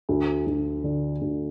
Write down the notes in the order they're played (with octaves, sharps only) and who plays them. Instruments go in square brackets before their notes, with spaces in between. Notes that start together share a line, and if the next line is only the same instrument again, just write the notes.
[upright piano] D2
D2
D3
D2